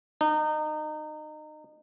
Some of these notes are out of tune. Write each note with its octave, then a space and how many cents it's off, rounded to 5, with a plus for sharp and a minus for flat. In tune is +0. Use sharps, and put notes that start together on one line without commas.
D#4 -25